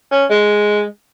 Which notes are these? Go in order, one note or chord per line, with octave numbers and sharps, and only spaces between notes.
C#4
G#3